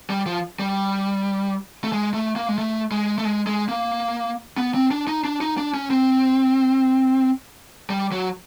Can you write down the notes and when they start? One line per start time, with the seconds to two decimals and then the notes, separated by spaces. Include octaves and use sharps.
0.10 G3
0.26 F3
0.59 G3
1.84 A3
1.92 G#3
2.14 A3
2.36 A#3
2.48 G#3
2.58 A3
2.91 G#3
3.18 A3
3.25 G#3
3.47 G#3
3.69 A#3
4.57 B3
4.74 C4
4.91 D4
5.08 D#4
5.25 D4
5.41 D#4
5.58 D4
5.74 C#4
5.90 C4
7.90 G3
8.12 F#3